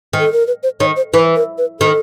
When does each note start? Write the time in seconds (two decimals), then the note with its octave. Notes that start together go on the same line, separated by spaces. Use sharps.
0.13 D#3
0.19 A4
0.32 A#4
0.47 B4
0.63 C5
0.80 D#3 C#5
0.96 C5
1.13 E3 B4
1.36 A#4
1.58 B4
1.80 D#3 A4